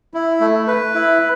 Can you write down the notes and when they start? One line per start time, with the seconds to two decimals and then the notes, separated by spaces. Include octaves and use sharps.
0.14 E4
0.41 A3
0.67 B4
0.95 E4